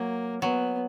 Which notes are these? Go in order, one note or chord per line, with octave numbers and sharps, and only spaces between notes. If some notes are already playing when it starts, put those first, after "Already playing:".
Already playing: F#3 A#3
F#3 B3